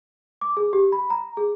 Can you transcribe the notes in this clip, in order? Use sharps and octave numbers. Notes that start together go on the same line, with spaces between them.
D6
G#4
G4
B5
A#5
G#4